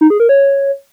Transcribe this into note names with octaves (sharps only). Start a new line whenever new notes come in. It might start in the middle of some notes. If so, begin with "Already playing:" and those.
D#4
G#4
A#4
C#5